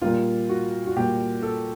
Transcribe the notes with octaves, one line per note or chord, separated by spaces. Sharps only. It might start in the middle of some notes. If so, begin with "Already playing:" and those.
A#2 G3 A#3 F4
F#4
F#4
A#2 G3 A#3 G4
A4